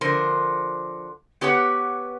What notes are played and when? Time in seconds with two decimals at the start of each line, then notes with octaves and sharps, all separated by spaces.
0.01 D3 F3 A#4 C5
1.41 B3 G4 B4 C#5 F#5